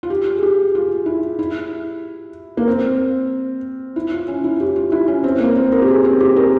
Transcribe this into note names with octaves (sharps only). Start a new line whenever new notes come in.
F4
G4
G#4
G4
F4
E4
E4
A#3
C4
E4
F4
C#4
E4
F4
G4
F4
E4
C#4
C4
A#3
C4
A#4
G4
G#4
C4
G4
A#4